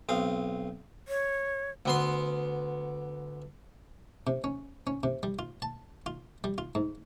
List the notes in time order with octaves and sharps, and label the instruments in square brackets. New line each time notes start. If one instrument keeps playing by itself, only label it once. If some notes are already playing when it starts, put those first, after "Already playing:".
[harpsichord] B1 C4 F5 D#6
[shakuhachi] C#5
[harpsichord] D2 B3 C6
C3
C#4
C#4
C3
G3
F4
A5
F4
G3
F4
G#2